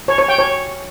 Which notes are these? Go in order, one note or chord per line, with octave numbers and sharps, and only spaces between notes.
C#5
C#5
G5
C#5